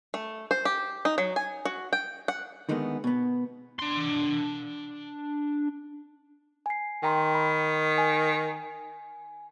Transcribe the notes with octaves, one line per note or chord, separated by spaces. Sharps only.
A3
C5
G4
D#4
F#3
G#5
F#4
G5
F#5
D3 D#3 G#3 A3 B3
B2 B3
D4 C6
G#5 C7
D#3 G5 A#5 C6
B5
G#5